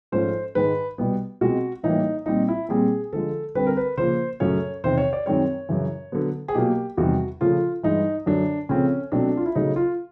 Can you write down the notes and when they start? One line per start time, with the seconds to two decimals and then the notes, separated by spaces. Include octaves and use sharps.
0.12 G#2 F3 A3 C#4 C5
0.55 G#2 D#3 G#3 B4
0.98 B2 G3 B3
1.41 B2 G#3 C4 F#4
1.84 A2 E3 G3 A#3 D#4
2.26 A#2 G3 C4 D#4
2.48 E4
2.69 A#2 G3 C4 G#4
3.13 D3 F3 G#3 A4
3.55 D3 G3 C4 B4
3.67 A#4
3.77 B4
3.97 C#3 F3 A#3 C5
4.40 F#2 C#3 F#3 A3 C#4 C#5
4.83 E2 C3 D#3 C5
4.98 C#5
5.13 D5
5.26 F#2 D#3 G#3 C4 C#5
5.69 F#2 C#3 E3
6.12 D3 F#3 B3
6.48 G#4
6.55 B2 F#3 A#3 G4
6.97 E2 C3 D#3 G3 F#4
7.41 C#3 F3 A3 F4
7.83 G2 E3 G#3 D#4
8.26 F#2 D3 F#3 D4
8.69 C#3 F3 A3 C4 C#4
9.12 B2 F#3 A3 C4 D4
9.37 F4
9.46 E4
9.55 C#3 F#3 A3 D#4
9.76 F4